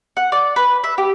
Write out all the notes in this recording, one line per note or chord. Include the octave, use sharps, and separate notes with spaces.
F#5
D5
B4
E5
G4